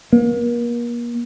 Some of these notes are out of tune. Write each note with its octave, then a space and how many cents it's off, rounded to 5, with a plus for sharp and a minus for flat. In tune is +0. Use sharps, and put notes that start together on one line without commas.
A#3 +35